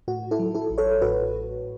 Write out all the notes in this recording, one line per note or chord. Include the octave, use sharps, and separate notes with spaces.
A2 F#4
E4 A4
F#3
E4 A4
A1
A4 C#5
A2 F#4 B4